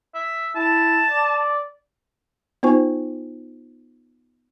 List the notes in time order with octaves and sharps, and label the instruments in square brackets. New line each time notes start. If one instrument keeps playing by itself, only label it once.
[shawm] E5
[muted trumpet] E4 [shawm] A5
[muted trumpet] D5
[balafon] B3 D#4 F4 C5 G#5 C#6